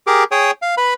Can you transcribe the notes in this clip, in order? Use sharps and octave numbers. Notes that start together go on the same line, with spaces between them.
G4 G#4 A#4 D6
G#4 C#5 G5 D#6
F5
B4 B5